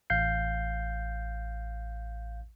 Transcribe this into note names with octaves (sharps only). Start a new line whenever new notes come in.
A1 F5 G6 C7